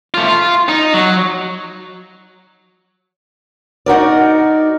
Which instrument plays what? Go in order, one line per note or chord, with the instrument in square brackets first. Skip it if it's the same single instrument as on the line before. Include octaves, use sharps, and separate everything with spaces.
[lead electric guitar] A3 F4
F4
D#4
F#3
[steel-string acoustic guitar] D#4 F#4 A#4 D5